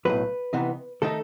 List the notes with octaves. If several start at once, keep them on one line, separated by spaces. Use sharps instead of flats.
B1 A2 F#3 B4
C3 E3 B3 D#4
D#3 A3 D#4 A4